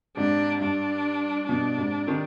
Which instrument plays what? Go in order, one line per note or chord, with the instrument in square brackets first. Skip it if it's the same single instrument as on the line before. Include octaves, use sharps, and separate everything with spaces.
[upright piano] G#2 C3 [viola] D4
[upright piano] G2 [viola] D4
[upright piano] G2 B2 [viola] D4
[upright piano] G#2 C3
C3 D#3